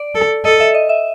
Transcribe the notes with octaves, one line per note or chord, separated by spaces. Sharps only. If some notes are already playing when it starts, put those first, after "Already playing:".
Already playing: D5
A4
A4 D#5
E5
D#5
E5